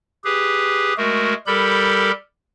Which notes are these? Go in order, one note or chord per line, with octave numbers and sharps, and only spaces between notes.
G4 G#4 B4
G#3 A3 F#4 A#4
G3 G4 A4 A#4 B5 G6